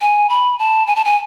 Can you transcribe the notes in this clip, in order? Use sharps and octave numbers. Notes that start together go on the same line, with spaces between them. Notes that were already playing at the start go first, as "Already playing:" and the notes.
G#5
B5
A5
G#5
A5
G#5